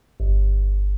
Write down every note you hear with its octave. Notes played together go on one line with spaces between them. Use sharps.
G1